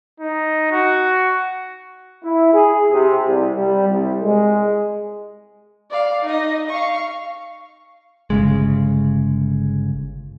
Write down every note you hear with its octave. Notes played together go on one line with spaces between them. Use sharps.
D#4
F#4
E4
G#4
C3
C2
G3
C2
G#3
D5 F5
D#4 D#5
F5 C#6
G1 C#3 G#3